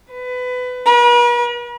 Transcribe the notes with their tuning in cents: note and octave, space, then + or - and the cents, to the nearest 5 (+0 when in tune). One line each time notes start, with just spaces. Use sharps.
B4 +20
B4 -45